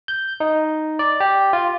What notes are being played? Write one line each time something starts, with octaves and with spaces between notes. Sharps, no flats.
G6
D#4
D5
G4
F4